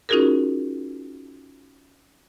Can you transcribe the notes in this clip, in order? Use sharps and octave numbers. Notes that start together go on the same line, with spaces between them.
C#4 D#4 F4 F#4 G#4 A#4